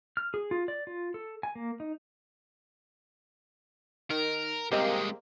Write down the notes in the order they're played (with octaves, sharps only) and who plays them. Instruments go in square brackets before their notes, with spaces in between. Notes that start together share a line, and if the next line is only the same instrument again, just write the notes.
[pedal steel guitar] F6
G#4
F4
D5
F4
A4
G#5
A#3
D#4
[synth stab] D#3 [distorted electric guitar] A#4
[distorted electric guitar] C2 G#3 [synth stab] A#3 C4 [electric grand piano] G4 A#4 D#5